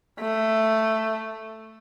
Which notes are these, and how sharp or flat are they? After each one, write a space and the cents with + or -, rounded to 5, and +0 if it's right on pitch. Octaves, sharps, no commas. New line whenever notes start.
A3 +5